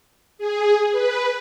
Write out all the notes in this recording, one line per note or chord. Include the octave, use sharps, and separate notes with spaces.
G#4
B4